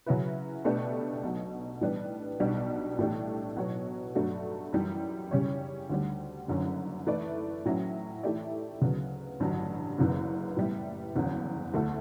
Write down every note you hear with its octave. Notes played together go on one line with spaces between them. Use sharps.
C#3 F#3 C#4 E4 B4
B2 A3 D4 G4 B4
B1 B2 F#3
A2 E3 G3 B3 D4
B1 B2 G3 D4 F#4
A2 E3 A3 D4 G4
B2 F#3 B3 F#4 C#5
G2 F#3 A3 D4 F#4
F#2 E3 G3
C#3 G3 C#4 G4 C#5
D2 D3 G3
F#1 F#2 D3 F#3 C#4
E3 A3 E4 B4 D5
A2 F#3 C#4 E4
E3 A3 E4 G4 D5
D2 C#3 F#3 B3
A1 G2 D3 F#3
F#1 F#2 C#3 E3 B3
A2 G3 B3 E4
F#1 E2 D3 F#3 C#4
D2 D3 A3 E4 A4